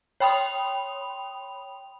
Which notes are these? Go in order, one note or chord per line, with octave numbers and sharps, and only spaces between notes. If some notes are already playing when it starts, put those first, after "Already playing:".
C#5 G5 B5 C6 D#6 F7